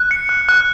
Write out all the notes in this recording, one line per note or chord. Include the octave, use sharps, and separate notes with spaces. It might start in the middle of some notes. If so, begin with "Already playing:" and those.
Already playing: F#6
C#7
F#6
F#6